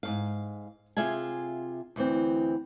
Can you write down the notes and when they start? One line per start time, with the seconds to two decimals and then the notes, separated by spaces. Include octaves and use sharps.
0.03 G#2 B2 F5
0.97 C3 F4 G#4 E5 F5 G#5
1.96 D2 E3 C4